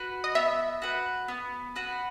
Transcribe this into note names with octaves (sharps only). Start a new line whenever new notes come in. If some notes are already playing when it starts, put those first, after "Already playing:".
Already playing: F#4 B4
D#5
B3 E5
F#4 B4
B3
F#4 B4